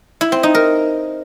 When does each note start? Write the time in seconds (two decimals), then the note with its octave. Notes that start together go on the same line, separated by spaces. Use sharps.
0.21 E4
0.32 C4
0.43 D#4
0.55 A#4